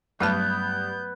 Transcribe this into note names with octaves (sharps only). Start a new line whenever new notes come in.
G2 F#3 A3 B3 A5 G6